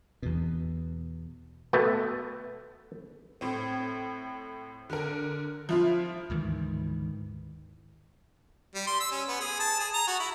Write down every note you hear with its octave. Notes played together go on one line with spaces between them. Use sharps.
E2 B2
B2 A3 B4
A2 C4
D3 A#4
F3 E4 F4
D2 G#2 D#3 E3
G3
C6
E6
C#4
B3
G#4
A5
G#4
A#5
F#4
E4